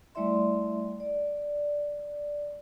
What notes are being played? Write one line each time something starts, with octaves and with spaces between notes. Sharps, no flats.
G3 A3 E4 D5 E5 C6
D5